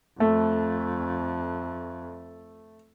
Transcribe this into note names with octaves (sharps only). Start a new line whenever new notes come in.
F2 A3